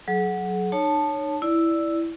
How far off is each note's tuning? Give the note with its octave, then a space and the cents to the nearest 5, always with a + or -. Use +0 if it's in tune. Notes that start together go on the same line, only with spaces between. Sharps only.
F#3 +0 G#4 +45
D#4 -35 C#5 +0 A5 +0
E4 +0 D5 +0